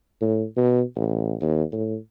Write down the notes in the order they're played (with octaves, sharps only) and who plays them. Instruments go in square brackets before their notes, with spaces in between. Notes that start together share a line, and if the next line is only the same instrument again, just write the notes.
[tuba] A2
B2
A1
D#2
A2